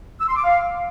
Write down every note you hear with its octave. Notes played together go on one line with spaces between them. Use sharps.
E6
C6
D6
F5